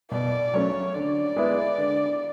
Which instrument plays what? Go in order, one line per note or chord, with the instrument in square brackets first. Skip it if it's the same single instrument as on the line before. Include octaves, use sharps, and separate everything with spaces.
[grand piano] B2 [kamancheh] D5
[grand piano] F#3 A3 C#4 [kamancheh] C#5
[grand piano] D3 [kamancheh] D5
[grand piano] G#3 B3 E4
D3